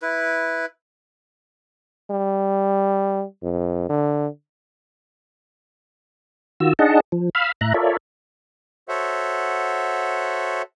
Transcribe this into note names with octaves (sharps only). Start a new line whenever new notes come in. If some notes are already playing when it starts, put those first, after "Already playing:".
E4 B4
G3
F2
D3
D#3 F4 F#4 E6
D4 D#4 G#4 D#5 F#5 A5
F3
F5 B5 E6 F6
A2 E5 A#5 F#6
F4 A4 A#4 C#5 D5 E5
F#4 A4 C5 C#5 E5 F#5